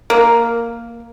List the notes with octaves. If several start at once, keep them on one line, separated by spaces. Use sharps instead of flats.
A#3